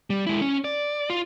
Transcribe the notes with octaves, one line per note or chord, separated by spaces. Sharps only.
G3
G#3 E4
C#4
D5
F4